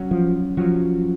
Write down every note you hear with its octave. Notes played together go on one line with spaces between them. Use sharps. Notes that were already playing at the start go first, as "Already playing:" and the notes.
Already playing: F#3 C#4 F#4
F3
F3 F#3 C#4 F#4